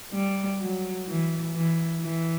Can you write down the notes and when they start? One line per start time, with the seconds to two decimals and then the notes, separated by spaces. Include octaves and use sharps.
0.13 G3
0.60 F#3
1.08 E3
1.55 E3
2.01 E3